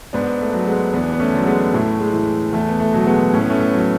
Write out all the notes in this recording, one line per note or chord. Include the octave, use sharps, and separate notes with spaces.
G#2 B3 D4
A3
F#3
G#3 B3
E2 B3 D4
B3
A3 C#4
D3 F#3
G#3 B3
A2 A3
G#3
E3
E2 A3
B3
A3
B2 F#3
G#3 B3
A2 C#4
B3
A3 C#4
A3
F#3